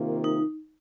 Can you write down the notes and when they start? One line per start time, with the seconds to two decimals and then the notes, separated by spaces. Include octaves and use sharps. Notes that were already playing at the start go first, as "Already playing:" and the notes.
Already playing: C3 D#3 A#3 F4
0.24 D#4